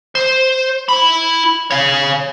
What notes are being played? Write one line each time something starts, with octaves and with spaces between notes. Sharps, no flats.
C5
E4 B5
C#5 F5